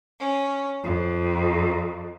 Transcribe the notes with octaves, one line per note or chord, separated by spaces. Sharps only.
C#4
F2